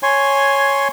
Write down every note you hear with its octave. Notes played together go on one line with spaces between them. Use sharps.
C#5 G#5 C6